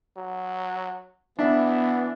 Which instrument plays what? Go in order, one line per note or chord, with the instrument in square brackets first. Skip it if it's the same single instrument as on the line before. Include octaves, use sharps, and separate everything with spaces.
[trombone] F#3
[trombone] E3 [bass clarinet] B3 [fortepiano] D4 E5